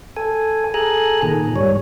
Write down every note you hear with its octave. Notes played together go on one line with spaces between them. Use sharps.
A4 G#5
G#4 A4 G#5 A#5 F#6
A#2 D#3
G#2 G3 C#5